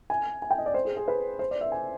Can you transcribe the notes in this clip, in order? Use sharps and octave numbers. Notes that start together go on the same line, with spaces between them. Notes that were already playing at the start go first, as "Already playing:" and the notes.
G#5
G#5
G5
D#5
D5
C5
G#4
G#4
B4
C5
D5
E5
G#5